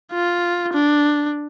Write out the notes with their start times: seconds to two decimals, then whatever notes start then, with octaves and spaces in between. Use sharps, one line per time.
0.12 F4
0.73 D4